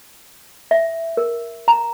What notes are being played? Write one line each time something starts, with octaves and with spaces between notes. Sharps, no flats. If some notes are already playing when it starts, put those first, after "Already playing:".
E5
A#4
A#5